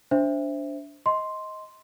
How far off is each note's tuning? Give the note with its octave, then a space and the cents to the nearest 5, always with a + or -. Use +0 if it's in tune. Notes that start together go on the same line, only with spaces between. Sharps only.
D4 -20 C5 +0 E5 +0
D#5 +15 C6 +0